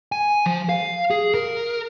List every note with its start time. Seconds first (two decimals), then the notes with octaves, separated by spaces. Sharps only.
0.12 G#5
0.46 F3
0.69 F5
1.10 G#4
1.34 A#4